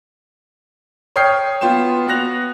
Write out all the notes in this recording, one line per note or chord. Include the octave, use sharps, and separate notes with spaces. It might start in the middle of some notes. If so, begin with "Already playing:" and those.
C#5 G5 D#6 F6 G6 C7
B3 F4 G5 E7
B3 F#4 F#6 A#6 F7